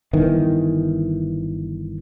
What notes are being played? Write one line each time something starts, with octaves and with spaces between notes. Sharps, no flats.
G1 D#3 E3